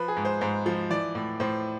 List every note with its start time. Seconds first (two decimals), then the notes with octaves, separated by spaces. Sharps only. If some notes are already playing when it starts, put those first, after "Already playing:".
Already playing: F3 B4
0.08 G#4
0.16 G#2
0.25 C5
0.41 G#2 C5
0.66 F3
0.90 E3 D5
1.15 A2
1.40 A2 C5